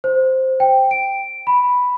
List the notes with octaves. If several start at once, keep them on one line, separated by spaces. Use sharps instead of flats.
C5
G5
D7
B5